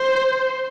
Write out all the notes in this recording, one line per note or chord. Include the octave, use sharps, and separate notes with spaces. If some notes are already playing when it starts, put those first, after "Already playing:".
Already playing: C5